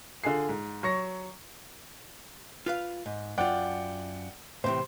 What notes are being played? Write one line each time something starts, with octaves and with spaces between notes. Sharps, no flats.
D3 F4 G#4 C7
G#2
F#3 C#6 A#6
F4 B4 F5
G#2
F#2 F4 D5 F#5 G5
A2 C3 E3 C5